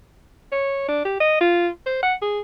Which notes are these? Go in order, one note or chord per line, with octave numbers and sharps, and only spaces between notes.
C#5
D4
G4
D#5
F4
C5
F#5
G#4